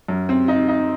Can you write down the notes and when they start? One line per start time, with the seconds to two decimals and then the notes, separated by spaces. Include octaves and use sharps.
0.08 F#2
0.29 C4
0.48 D#4
0.68 D#4